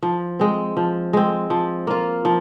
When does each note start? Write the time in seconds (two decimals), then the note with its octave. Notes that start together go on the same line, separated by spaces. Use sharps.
0.02 F3
0.39 G#3 C4
0.77 F3
1.13 G#3 C4
1.50 F3
1.87 A#3 F4
2.25 F3